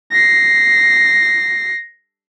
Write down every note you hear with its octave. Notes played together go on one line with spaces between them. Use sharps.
A#6 C7